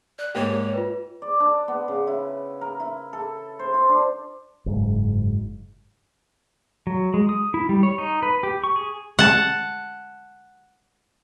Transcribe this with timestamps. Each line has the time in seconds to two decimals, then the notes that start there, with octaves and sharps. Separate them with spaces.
0.19 D5 F#6
0.35 G#2 A#3 G4 C#5
0.74 F4 B4
1.22 D5
1.40 D4
1.68 B3
1.88 C#3
2.07 E4
2.61 A#4
2.80 E4
3.13 A4
3.59 C5
3.74 F4
3.89 D4
4.66 F#1 G#2
6.87 F#3
7.14 G#3
7.29 D#6
7.54 E4
7.69 G3
7.83 C#5
7.98 D#4
8.22 B4
8.43 G4
8.64 C#6
8.76 G#4
9.19 F#5 A5